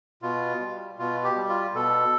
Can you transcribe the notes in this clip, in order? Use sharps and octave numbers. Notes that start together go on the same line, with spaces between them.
B2 F4
G3
B2 F4
G4
G3
F4
B2 A4